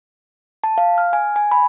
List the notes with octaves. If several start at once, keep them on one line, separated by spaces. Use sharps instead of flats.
A5
F5
F6
G#5
G#5
B5